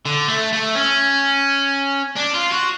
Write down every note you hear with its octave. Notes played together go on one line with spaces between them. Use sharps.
D3
A3
A3
C#4
D4
F4
F#4